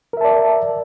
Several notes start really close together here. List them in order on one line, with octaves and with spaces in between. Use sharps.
A#4 E5 A5 D5